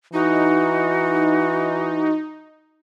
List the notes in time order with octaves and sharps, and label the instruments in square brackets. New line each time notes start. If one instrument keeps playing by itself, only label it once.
[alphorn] E3 [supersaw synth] D#4 [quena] F#4